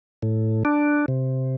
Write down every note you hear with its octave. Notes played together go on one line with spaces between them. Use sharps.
A2
D4
C3